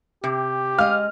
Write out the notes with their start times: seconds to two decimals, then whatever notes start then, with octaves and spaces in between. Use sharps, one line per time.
0.24 C3 G4
0.78 G#3 D#5 F5 F6